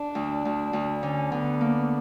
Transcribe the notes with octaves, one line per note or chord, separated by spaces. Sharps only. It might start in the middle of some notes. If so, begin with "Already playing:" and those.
Already playing: D4
D2
D2
D2
D3 C#4
D3 B3
A#3